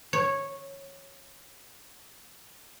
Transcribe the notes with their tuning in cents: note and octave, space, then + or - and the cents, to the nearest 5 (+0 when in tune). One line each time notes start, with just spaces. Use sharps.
C#5 -10